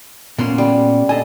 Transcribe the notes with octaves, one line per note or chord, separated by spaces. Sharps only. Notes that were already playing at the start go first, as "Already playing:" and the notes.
A#2 A#3 B3 C#4 C6
G3
D4 A4 D#5 G#5